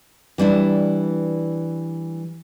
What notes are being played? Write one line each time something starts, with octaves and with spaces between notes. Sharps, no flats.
E3 G3 D4 E4